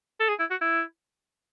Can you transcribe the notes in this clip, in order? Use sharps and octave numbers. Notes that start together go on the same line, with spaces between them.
A4
G#4
E4
F#4
E4